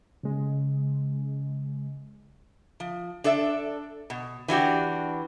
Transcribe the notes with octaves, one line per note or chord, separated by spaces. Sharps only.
C#3 G#3
F3
D4 A4 D5 E5
B2
E3 D4 F#4 G4